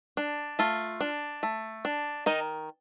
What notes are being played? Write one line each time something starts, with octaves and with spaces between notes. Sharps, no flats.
D4
A3 F4
D4
A3
D4
D#3 D#4